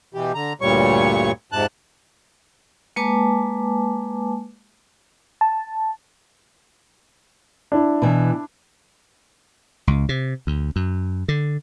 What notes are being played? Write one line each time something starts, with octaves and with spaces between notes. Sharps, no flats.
B2 E3 G4
D3 A#5
D2 G2 A#2 G3 C#5 C#6
F2 G#2 C3 A5 F#6
G#3 A#3 B4 G#5 A5 D6
A5
D4 E4
B2 E3
C#2
C3
D2
F#2
D3